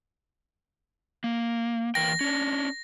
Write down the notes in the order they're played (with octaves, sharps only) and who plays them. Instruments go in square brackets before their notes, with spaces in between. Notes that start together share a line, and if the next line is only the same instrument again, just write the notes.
[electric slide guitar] A#3
[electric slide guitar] E3 A#3 G5 [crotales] A#6
[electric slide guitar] C#4 D4